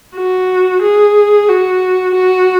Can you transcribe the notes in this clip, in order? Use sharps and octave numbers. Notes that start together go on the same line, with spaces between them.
F#4
G#4
F#4
F#4